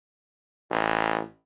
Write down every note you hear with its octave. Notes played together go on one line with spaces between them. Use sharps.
A1